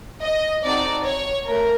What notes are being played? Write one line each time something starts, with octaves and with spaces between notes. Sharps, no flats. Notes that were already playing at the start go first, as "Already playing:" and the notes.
D#5
C4 D#4 F#4 A4 D5
C#5
A3 A#4